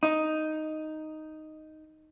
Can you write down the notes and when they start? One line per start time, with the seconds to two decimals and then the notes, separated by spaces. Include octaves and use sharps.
0.03 D#4